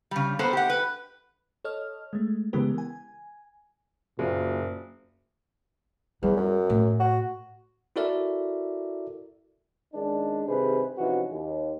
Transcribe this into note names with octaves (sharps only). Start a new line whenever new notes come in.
C#3 G3
A#3 B3 A4 C5
G4 F#5
B4
A4 C#5 D#5 F6
G#3 A3
C#3 E3 G#3 B3 G4 A#4
G#5
F#1 A#2
E2 G3
F#2
A2
F#4
E4 F#4 A4 A#4 D5 E5
D#3 G#3 C#4 D4
G2 C3 D#3 G#4 B4 C5
C3 E3 F3 C#4 D#4 F#4
D#2